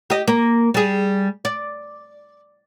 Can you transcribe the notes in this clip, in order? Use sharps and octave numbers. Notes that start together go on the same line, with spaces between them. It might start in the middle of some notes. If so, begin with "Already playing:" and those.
G4 D#5
A#3
G3 G#4
D5